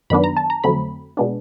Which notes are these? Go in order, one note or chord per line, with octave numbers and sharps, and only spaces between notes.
F#2 D#3 F#3 B3 D4 B5
A#5
A5
A#5
F2 D3 F#3 A3 C4 B5
B2 G#3 B3 D4